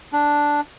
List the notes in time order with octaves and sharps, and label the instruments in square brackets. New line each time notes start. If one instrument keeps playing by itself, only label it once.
[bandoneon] D4